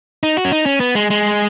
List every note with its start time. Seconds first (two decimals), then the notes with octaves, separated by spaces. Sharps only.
0.23 D#4
0.37 F#4
0.45 C#4
0.52 D#4
0.66 C#4
0.80 B3
0.95 G#3
1.10 G#3